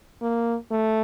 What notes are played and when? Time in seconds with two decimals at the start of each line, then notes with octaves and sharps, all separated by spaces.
0.22 A#3
0.71 A3